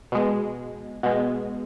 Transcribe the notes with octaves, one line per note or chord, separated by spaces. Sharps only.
B2 G#3
B2 G#3